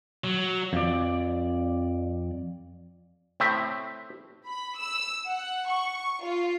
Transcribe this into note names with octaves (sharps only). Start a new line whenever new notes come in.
F#3
F2 D5
A2 C4 E5
B5
E6
F#5
C#6
F4